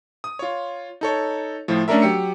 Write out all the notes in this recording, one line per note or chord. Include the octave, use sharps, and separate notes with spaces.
D#6
F4 C#5
D#4 A4 C#5
A2 F3
A3 C#4 D4 A4 A#4 E5
F#3 G4 E6 C#7